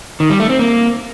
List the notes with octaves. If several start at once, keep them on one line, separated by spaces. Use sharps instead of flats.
D#3
G3
A3
C4
A#3